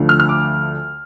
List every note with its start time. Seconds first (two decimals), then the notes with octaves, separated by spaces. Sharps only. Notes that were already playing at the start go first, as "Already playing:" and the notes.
Already playing: D2 D3 F3 A3
0.09 F6
0.20 F6
0.29 D6